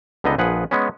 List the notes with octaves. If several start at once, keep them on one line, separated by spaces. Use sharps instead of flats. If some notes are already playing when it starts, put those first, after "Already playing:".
C#2 D3 B3 D#4 D#5
A#1 F3 G#4 B4 F#5
G#3 B3 C#4